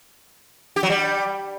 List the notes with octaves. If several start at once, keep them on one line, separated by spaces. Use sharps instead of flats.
G4
F#3
G3